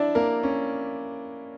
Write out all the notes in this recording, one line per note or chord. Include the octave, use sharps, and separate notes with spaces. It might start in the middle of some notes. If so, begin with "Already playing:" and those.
Already playing: D4 E4 D5 E5
A#3 A#4
C#4